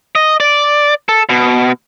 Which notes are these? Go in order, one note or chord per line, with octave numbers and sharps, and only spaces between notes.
D#5
D5
A4
B2